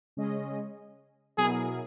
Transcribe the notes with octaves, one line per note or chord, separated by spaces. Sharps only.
C#3 G#3 C#4 G#4 D#5
B2 F#3 B3 E4 G#4 A#4